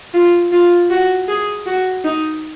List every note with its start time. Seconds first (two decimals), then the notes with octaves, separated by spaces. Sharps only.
0.14 F4
0.52 F4
0.91 F#4
1.29 G#4
1.67 F#4
2.05 D#4